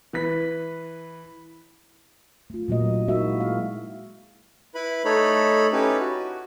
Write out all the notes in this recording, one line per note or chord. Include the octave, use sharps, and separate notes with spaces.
E3 B4 B6
A3 F4
A#2 F#3 A#3 D#5
E4
G#3 A#3 D#4 E4 F#4 E5
G#4 F5
E4 B4 B5
A3 D#4 A4 C#5 B5
C#4 D#4 E4 G4 A4 B4
F#4